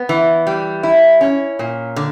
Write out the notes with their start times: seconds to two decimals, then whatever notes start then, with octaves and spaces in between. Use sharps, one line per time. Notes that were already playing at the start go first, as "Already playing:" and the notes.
Already playing: B3
0.09 E3
0.47 G3
0.83 E4
1.21 C#4
1.59 A#2
1.96 D3